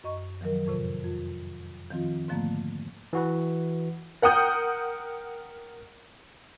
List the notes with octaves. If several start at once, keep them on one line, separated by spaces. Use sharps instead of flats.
F#2 D#5 C#6
D#3 F3 F#3 A#4
F2 A2 C3
F2
D#3 F3 C4 F4
G#2 D3 F3 A3 A#3
E3 F#4 B4
A#4 F#5 G5 D#6 G6